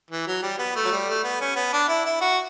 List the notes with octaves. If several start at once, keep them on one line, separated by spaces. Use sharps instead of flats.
E3
F#3
G3
B3
A3
F#3
G3
A3
B3
C#4
B3
D4
E4
E4
F#4